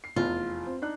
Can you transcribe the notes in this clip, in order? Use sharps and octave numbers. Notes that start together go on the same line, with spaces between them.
C7
F1 E2 F4
C4
D4 D#4 F#6